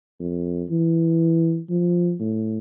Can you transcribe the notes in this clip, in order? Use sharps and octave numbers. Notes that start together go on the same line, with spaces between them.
F2
E3
F3
A2